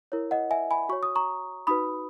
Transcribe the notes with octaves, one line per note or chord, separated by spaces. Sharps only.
E4 A#4 C#5
D#5 F#5
E5 G#5
G#5 B5
F#4 C#5 C#6
D#6
A#5 C#6
D#4 F#4 B4 B5 D#6